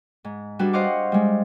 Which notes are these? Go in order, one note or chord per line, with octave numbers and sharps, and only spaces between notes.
G#2
G3 D4 F#4 G#4 B4
C5 D#5 F5 F#5 C#6 D6
G3 G#3